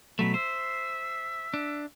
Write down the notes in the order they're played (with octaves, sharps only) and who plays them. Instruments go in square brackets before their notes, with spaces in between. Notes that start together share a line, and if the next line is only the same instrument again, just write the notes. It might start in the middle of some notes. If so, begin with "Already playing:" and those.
[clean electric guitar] B2 F#3 A3 [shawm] B5
[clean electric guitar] C5 [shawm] E5
[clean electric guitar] D4